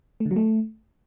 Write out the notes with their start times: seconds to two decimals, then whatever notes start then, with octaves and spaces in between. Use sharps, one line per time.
0.20 A3
0.26 D3
0.31 F#3
0.36 A3